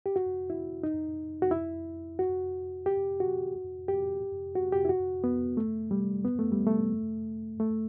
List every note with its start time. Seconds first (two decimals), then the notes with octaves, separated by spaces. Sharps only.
0.06 G4
0.16 F#4
0.50 E4
0.83 D#4
1.42 F#4
1.51 E4
2.19 F#4
2.86 G4
3.20 F#4
3.88 G4
4.55 F#4
4.72 G4
4.85 E4
4.89 F#4
5.24 B3
5.57 A3
5.91 G3
6.25 B3
6.39 A3
6.52 G3
6.67 A3
7.60 A3